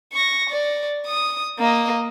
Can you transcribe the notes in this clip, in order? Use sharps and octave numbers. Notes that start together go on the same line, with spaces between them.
C#6 A#6
D5
D#6
A#3 D#5